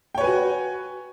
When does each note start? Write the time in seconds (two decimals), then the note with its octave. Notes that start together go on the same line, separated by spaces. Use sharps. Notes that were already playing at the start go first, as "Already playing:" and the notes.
0.15 G5
0.18 C#5
0.21 B4
0.24 G#5
0.27 F#4